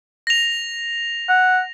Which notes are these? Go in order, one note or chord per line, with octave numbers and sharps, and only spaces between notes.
A#6 F7
F#5